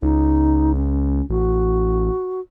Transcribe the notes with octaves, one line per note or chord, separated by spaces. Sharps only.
C#2 D#4
C#4
A1 F#4